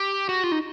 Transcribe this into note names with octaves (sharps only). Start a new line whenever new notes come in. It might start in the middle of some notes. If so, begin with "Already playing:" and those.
Already playing: G4
F#4
F4
D#4